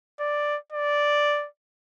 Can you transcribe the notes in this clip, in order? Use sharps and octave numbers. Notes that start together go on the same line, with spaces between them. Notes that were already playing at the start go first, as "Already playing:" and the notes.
D5
D5